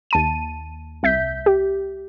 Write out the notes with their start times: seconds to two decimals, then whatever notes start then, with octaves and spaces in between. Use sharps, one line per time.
0.11 D#2 A5 D#7
1.03 C2 E5 G6 B6
1.46 G4